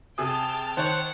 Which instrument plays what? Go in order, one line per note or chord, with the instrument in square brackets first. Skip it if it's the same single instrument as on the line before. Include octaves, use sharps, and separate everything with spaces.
[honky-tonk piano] C3 G#4 D#6 [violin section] G5 A5 F6
[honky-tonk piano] D#3 C#5 F7 [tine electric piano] C5 [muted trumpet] F#5